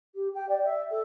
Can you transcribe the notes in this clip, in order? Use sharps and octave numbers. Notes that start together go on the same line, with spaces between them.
G4
G5
D5
E5
A4